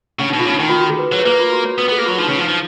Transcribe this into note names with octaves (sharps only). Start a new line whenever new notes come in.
C#3 C#4
B2 D#4
F4
C#3 D#4
D#3 D#4
F4
F#4
G#4
B4
F#3 B4
C#5
A#3 B4
F4
F#4
C#5
B3 B4
B3 G#4
A#3
F#3 F4
F3 D#4
C#3 C#4
F3 D#4
F3 D#4